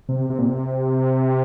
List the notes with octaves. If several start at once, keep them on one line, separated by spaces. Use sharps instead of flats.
C3
C3
A#2
C3